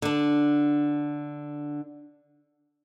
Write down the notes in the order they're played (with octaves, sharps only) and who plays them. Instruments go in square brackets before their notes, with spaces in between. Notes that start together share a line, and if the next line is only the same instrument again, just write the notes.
[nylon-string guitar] D3 D4